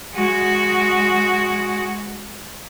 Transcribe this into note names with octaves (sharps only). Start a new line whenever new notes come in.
G#3 F#4